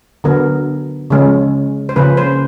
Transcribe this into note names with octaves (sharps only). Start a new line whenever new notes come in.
D3 F#3 B3 A#4
C#3 F3 G#3 C#4
C5
C#3 F3 A#3 C#4 B4
C5